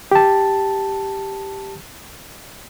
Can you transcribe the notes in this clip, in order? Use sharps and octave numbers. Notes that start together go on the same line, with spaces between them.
G4 A5